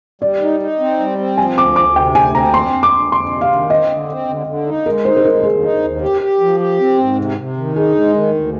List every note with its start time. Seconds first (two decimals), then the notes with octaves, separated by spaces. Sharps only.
0.22 G3 D5
0.41 D#4
0.60 D#4
0.80 C4
0.99 G3
1.18 C4
1.38 F3 G#5
1.57 D2 D6
1.76 D2 D6
1.96 C3 G5
2.15 D2 G#5
2.34 C4 A#5
2.54 F2 C6
2.73 F2
2.83 D6
2.93 F2
3.12 F2 C6
3.31 C3
3.41 F5
3.50 D#3
3.69 C4 D#5
3.89 D3
4.09 C4
4.28 D3
4.47 D3
4.67 D#4
4.86 G#3 A#4
5.05 D#4 C5
5.17 C5
5.24 G#3 A#4
5.40 A#4
5.43 D#2 G#4
5.63 D#4
5.83 D#2
6.01 G4
6.21 G4
6.40 F3
6.60 G4
6.80 C4
6.98 G#2
7.18 C3
7.37 C3
7.57 D#3
7.76 D#4 G#4
7.95 G#3
8.15 D#3
8.34 D2